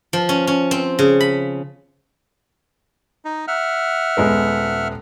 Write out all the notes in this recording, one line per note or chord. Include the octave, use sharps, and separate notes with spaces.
F3
C#4
C#4
C4
C#3
B5
D#4
E5 F#5 F6
D#1 G#3 B3